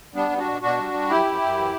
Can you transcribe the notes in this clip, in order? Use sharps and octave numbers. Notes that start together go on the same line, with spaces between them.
G3 B3 D4
G3
D4 F#4
B2
B2 D4 F#4
G3
G3
F#2 E4 G4
F#2
F#2
E3